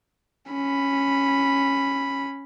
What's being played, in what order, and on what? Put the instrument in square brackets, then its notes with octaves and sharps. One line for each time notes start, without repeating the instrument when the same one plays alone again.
[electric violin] C#4 B5